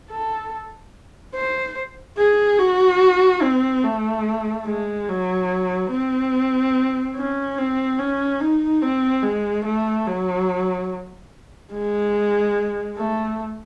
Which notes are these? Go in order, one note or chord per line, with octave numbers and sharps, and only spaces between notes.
A4
C5
G#4
F#4
C4
A3
G#3
F#3
C4
C#4
C4
C#4
D#4
C4
G#3
A3
F#3
G#3
A3